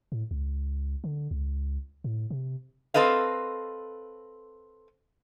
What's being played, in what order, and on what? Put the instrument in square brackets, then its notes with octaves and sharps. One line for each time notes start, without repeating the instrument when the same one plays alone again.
[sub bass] A2
C#2
D3
C#2
A2
C3
[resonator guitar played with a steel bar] C4 A4 B4 D#5 F5